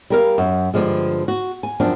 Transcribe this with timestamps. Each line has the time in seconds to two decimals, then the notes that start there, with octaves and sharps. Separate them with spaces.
0.10 G3 A#4 F5
0.38 F#2
0.74 G2 D3 F3 G#3
1.28 F#4
1.63 G#5
1.80 F#2 F3 C4 D4